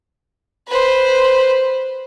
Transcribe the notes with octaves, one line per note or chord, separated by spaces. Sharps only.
B4 C5